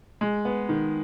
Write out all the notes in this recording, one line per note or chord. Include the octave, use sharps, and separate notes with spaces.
G#3
B3
D#3